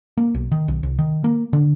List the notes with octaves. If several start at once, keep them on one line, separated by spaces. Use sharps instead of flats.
A#3
B1
D#3
B1
C2
D#3
A#3
D3